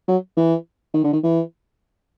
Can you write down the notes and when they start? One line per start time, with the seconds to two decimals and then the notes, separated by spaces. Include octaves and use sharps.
0.08 F#3
0.37 E3
0.94 D#3
1.04 D3
1.13 D#3
1.23 E3